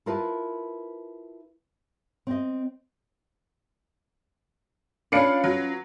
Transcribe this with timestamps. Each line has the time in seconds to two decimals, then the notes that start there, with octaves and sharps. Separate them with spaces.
0.06 E4 F4 A#4 B4 A5
2.27 C4 D#5
5.12 C#4 D4 F4 B4 F5 C#7
5.44 F#3